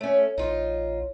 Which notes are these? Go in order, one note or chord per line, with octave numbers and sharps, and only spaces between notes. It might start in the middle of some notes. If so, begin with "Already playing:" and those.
A3 C#4 C#5
A#1 D#4 F4